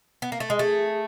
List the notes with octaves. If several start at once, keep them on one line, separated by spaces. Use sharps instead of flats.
B3
A#3
A3
G#3
A3 G#4